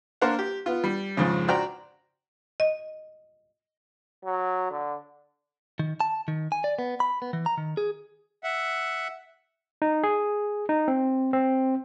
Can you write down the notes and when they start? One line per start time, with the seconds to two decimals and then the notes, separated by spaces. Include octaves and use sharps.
0.21 A#3 D4 A#4 C5 F5 F#5
0.39 G4
0.66 B3 F4
0.84 G3
1.17 F2 G#2 C#3
1.48 F#4 C5 D5 G5 A#5
2.60 D#5
4.25 F#3
4.71 D3
5.79 D#3
6.00 A5
6.28 D#3
6.52 G#5
6.64 D5
6.79 B3
7.00 B5
7.22 B3
7.33 E3
7.46 A#5
7.58 D#3
7.77 G#4
8.44 E5 F#5
9.82 D#4
10.04 G#4
10.69 D#4
10.88 C4
11.33 C4